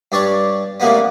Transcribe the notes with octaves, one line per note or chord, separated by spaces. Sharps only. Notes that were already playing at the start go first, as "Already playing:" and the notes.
G2 G3 D4 C#5 A5
A2 C#3 G3 A#3 B3